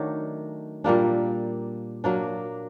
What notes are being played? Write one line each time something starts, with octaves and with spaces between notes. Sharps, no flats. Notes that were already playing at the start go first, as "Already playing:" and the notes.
Already playing: D#3 F#3 A3 D4
A#2 G3 A#3 D4
F#3 A#3 D4